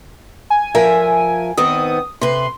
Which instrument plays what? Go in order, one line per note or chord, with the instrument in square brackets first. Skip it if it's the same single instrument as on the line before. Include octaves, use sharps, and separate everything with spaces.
[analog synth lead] G#5
[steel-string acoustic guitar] F3 A#4 E5
[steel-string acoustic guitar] D#3 B3 C4 [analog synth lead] D#6
[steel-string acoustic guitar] C3 B4 [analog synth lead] C6